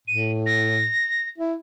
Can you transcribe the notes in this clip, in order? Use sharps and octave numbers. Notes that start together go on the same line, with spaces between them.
A2 D#7
A#6
E4